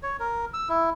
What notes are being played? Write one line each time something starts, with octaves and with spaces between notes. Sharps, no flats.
C#5
A#4
E6
E4